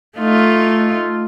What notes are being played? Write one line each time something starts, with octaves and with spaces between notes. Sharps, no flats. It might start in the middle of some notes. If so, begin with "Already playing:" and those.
A3 D#4 F4